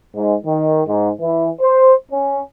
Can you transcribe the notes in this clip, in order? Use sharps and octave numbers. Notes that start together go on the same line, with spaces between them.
G#2
D#3
G#2
E3
C5
C#4